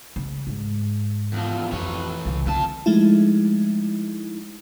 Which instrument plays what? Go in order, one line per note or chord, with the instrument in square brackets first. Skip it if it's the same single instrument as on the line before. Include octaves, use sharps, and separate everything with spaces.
[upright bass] C#3
G#2
[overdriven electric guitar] E2 F3
[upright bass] F2 [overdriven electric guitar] E3 C#5
[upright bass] C2 C#3
[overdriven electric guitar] F2 A5 [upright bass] D3
[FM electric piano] F3 G#3 A3 D#4 E4